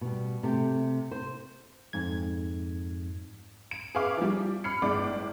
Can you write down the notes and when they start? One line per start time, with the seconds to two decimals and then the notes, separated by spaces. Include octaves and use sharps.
0.01 B2 G3
0.43 C3 A3 G4
1.11 C5
1.93 F2 G#2 G#6
3.71 D7
3.95 G#4 B4 E5 F5 C#6 D6
4.17 F3 G3
4.64 B5 F6 C7 C#7
4.82 G1 A2 G#3 D5 D6